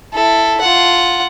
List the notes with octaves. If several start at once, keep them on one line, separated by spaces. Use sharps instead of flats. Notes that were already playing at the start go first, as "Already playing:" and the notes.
E4 A4
F4 F#5